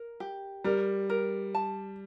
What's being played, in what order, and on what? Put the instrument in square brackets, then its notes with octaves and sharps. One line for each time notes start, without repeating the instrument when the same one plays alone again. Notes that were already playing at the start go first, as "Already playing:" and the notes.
Already playing: [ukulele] A#4
G4
[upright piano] G3 [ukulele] A#4
[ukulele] A#4
A5